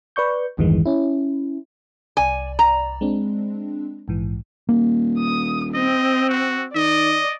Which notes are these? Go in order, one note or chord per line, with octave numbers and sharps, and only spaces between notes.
B4 D5 C#6 G6
A1 E2 G2 D#3 E3 G#3
C#4 E4
C2 D5 G#5
A#5
G#3 C4 D4
A#1 G#2 E3
D#1 A#3
D#6
C4 D#5
F#4
D#3 D5 D#5